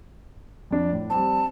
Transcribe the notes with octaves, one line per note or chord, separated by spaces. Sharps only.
F2 D4
A2
G3 C4 A5